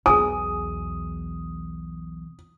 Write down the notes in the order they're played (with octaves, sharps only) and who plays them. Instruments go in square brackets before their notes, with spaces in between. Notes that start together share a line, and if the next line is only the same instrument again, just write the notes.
[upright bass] B1 E2 [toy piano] G#4 G#5 [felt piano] D#6